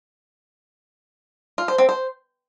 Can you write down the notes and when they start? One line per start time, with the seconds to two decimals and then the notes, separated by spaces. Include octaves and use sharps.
1.58 F4
1.68 C5
1.78 C4
1.89 C5